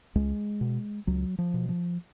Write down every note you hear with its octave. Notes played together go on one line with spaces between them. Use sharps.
C#2 G#3
B2
C#2 F#3
F3
B2
F3